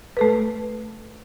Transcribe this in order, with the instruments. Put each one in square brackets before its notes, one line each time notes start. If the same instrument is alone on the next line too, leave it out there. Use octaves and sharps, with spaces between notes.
[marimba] A3 A4 B4